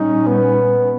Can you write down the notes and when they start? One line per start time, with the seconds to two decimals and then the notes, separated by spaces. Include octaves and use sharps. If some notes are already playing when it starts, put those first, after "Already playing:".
Already playing: A#2 G3 C#4 D#4
0.27 B3